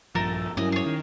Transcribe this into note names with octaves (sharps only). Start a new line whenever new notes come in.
A#1 G2 F3 A3 A4 A#4
G2 F#3 C#4 E4 A#4 D#5 G#5
G#4 C#5
D#3